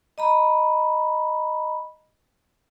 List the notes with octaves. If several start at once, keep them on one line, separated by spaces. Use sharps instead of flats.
D#5 A#5 B5